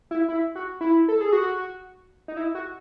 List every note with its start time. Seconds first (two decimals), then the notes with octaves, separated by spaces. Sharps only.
0.11 E4
0.29 E4
0.55 F#4
0.81 E4
1.08 A4
1.21 G#4
1.33 F#4
2.28 D#4
2.37 E4
2.55 F#4